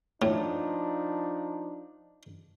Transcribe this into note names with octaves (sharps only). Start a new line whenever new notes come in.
A2 F3 D4 D#4